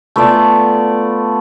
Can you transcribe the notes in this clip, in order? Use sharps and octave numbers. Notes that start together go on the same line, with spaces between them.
A3 B3 F4 D5